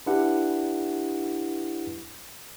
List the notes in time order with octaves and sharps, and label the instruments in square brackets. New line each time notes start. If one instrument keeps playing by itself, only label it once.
[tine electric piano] D4 E4 G4 B4 F#5